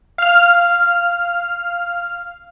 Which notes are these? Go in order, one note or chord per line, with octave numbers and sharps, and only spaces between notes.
F5 F6